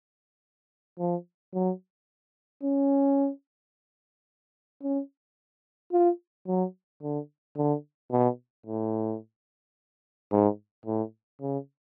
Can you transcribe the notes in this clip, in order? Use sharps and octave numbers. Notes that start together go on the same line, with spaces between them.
F3
F#3
C#4
C#4
F4
F#3
D3
D3
B2
A2
G#2
A2
C#3